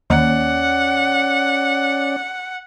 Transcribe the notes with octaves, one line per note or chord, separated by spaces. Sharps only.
D#2 C#4 D5 F#5